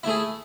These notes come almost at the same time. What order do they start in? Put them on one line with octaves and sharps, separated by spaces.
E4 A3 G#4